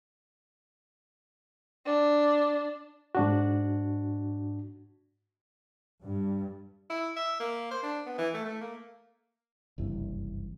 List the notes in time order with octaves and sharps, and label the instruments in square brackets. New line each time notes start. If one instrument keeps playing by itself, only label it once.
[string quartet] D4
[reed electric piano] G#2 D4 F#4
[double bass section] G2
[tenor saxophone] E4
E5
A#3
C5
D4
B3
E3
A3
A3
A#3
[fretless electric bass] F#1 C2 G2 E3